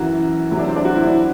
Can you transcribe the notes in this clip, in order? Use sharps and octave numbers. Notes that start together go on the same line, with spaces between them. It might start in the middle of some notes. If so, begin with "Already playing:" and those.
Already playing: F#2 E3 F#4
E2 C3 F#3 E4
D4
C4
D4
F#4
E4
D4